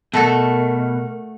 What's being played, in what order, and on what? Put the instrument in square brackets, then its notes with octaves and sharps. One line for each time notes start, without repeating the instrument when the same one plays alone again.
[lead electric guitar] B2 [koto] A3 F#4 A4 [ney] A#4